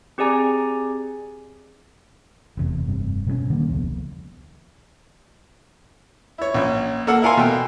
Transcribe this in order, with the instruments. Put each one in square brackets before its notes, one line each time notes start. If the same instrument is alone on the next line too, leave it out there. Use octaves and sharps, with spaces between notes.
[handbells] C4 G4 G#4 D5 G#5 A#5
[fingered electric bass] F1 E2 C3
F1 G2 C3
B2 G3 A#3 C#4
D3 D#3 G3 A#3
E1 C#2 F3 B3
[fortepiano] E4 C#5
A#1 C#4
A#3 A4 F#5
E4 A4 A#4 F5 G#5 C6
B2 G5